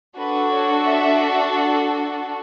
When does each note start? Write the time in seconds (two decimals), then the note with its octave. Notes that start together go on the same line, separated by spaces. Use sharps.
0.16 D4 F#4 A4 B4
0.51 C#5
0.85 E5